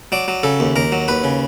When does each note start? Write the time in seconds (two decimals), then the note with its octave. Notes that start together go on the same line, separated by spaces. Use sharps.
0.12 F#3 D5
0.28 F#3
0.43 C#3 A4
0.60 D#2
0.76 D#2 A#4
0.92 F#3
1.08 D#2 B4
1.24 C#3